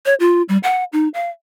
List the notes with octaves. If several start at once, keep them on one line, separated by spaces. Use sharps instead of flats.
C#5
F4
G3
F#5
D#4
F5